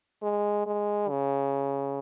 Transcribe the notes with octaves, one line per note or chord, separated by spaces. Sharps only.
G#3
G#3
C#3